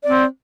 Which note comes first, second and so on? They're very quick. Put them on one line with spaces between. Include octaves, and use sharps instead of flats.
D5 C4 C5